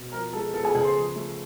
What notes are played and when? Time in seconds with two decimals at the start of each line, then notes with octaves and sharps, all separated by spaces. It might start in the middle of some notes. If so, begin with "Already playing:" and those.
Already playing: B2
0.12 F3 A#4 A#5
0.33 G#3 A4 A5
0.54 B3 A4 A5
0.64 G#4 G#5
0.75 C#3 G#4 G#5
0.85 C5 C6
0.95 F3
1.16 A3